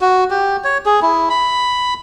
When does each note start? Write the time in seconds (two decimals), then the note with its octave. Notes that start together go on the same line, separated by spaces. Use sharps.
0.01 F#4
0.30 G4
0.64 C#5
0.86 G#4
1.02 E4
1.30 B5